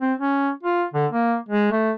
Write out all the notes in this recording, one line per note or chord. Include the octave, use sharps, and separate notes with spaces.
C4
C#4
F4
D3
A#3
G#3
A3